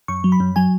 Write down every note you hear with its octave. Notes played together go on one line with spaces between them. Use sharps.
F#2 C#6
F#3
B5
F#2
F#3 G#5